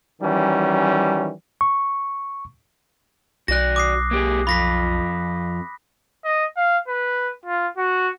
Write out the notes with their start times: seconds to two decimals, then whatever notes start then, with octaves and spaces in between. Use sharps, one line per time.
0.21 D#3 E3 F#3 G3 C#4
1.61 C#6
3.48 B1 F#4 D5 F#6 A#6
3.76 D6 D#6 C7
4.11 A#3 G4 G#4
4.47 F2 F4 B5 A#6 B6
6.25 D#5
6.57 F5
6.88 B4
7.45 F4
7.77 F#4